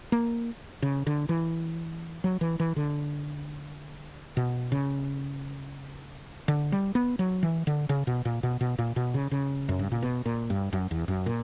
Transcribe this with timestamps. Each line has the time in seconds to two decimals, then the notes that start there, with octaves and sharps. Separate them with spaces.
0.12 A#3
0.82 C#3
1.07 D3
1.29 E3
2.24 F#3
2.41 E3
2.60 E3
2.76 D3
4.37 B2
4.72 C#3
6.48 D3
6.72 G3
6.95 B3
7.19 F#3
7.43 E3
7.67 D3
7.89 C#3
8.07 B2
8.25 A#2
8.43 B2
8.61 B2
8.79 A#2
8.96 B2
9.14 C#3
9.31 C#3
9.69 F#2
9.79 G2
9.92 A#2
10.02 B2
10.26 A#2
10.50 G2
10.73 F#2
10.91 E2
11.08 F#2
11.26 A#2